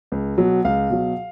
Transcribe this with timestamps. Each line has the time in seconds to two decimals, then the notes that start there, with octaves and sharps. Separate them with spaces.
0.12 C#2
0.38 B2 F#3
0.65 C#2 F5
0.90 B2 F#3